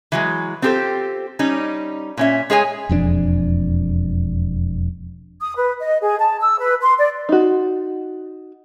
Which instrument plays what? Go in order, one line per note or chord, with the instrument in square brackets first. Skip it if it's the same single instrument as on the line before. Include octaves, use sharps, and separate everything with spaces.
[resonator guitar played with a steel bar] E3 F#3 G#3
C4 F4 G4 A4 C5
G3 C#4 D#4
A#2 C#4 E5
G#3 G#4 C#5 G#5
[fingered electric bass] E1 F2 E3 D4
[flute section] D#6
B4
D#5
G#4
A5
E6
B4
C6
D5
[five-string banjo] D#4 F#4